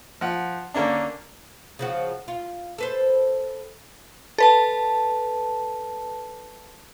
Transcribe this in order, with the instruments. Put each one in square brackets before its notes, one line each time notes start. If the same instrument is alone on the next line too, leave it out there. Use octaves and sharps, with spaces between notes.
[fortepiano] F3 F#5
D3 A#3 C#4 D4
[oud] C#3 F3 F#4
F4
A4 B4 C5
[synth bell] A4 B4 A5